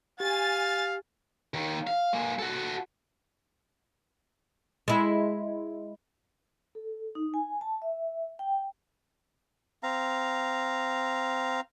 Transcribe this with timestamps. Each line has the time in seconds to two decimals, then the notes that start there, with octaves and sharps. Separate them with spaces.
0.20 G4 F5 G#5 A6
1.54 D#2 D#3
1.87 F5
2.13 G#3 A#3
2.39 F#4 A4
4.88 G#3 E4
6.75 A4
7.15 D#4
7.34 G#5
7.61 A5
7.82 E5
8.39 G5
9.83 C4 F5 A#5